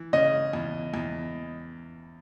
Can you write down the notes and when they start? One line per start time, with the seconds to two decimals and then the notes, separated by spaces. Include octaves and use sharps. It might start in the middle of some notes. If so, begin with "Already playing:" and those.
Already playing: E3
0.13 C#3 D#5
0.53 E2
0.94 E2